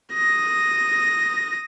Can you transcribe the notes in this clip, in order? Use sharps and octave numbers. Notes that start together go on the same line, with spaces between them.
D#6 A#6